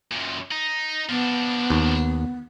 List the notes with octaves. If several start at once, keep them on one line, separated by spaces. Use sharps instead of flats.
F#2 A#2
D#4
F3 B3 D4
D#2